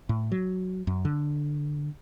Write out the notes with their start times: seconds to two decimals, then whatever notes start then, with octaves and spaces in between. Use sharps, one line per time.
0.09 A2
0.32 F#3
0.87 F#2
1.05 D3